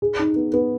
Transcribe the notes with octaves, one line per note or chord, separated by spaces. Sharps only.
G#4
D#4
B3
B3